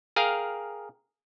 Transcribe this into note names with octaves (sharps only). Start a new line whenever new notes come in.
G#4 A#4 F5 G5